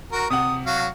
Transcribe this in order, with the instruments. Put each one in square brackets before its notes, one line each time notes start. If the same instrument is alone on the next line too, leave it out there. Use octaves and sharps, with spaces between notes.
[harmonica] F#4 A#4
[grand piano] C3 F#5 [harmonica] D#6
[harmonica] F#3 F#4 F5